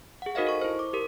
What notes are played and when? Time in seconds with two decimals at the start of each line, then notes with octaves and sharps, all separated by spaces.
0.22 G#4 F#5
0.35 D#4 F#4 A#4 C5 D#5 F5
0.47 A4 C#6
0.61 E4 C5
0.79 D6
0.93 G4 A#4